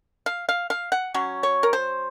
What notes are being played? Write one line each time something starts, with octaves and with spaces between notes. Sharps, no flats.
F5
F5
F5
F#5
F#3 C#4
C#5
A#4
C5